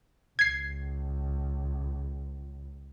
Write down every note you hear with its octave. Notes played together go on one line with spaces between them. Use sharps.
C#2 G#6 C7